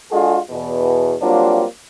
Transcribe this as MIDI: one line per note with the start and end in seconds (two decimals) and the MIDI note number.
0.11 0.36 56
0.11 0.36 62
0.11 0.36 65
0.11 0.36 66
0.11 0.36 68
0.11 0.36 69
0.50 1.13 40
0.50 1.13 47
1.21 1.63 54
1.21 1.63 55
1.21 1.63 58
1.21 1.63 60
1.21 1.63 62
1.21 1.63 65